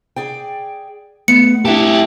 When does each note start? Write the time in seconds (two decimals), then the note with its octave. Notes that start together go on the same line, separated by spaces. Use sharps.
0.16 G#4 D5 G5
1.28 G#3 A3 B3 C#7
1.65 D4 E4 G4 E5 A5